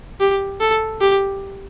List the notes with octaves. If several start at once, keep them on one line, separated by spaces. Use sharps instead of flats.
G4
A4
G4